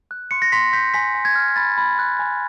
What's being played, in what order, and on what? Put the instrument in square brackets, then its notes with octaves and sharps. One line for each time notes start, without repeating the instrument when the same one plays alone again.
[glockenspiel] F#6
C6 C#7
A#6
C6 B6
G6 B6
G#5 B6
G#5
G#6
F6
B5 A6
B5
F#6
G#5